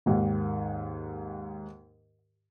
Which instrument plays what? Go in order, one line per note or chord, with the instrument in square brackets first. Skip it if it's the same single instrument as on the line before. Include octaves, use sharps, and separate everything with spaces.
[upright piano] D#2 G#2 D#3